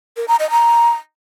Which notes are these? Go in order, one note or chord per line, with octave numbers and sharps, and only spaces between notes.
A#4
A#5
D#5
A#5